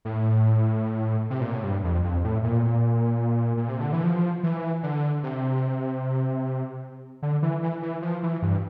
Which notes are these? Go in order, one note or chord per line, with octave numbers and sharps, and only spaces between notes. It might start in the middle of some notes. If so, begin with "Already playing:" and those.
A2
C3
A#2
A2
G2
F2
F2
A2
A#2
A#2
C3
D3
E3
F3
E3
D3
C3
D3
E3
E3
E3
F3
E3
G2